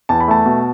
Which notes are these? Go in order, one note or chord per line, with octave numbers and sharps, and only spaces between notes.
E2 A5
B5
A3 A5
B2